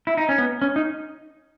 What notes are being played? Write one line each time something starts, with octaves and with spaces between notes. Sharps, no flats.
E4
D#4
C#4
B3
C#4
D#4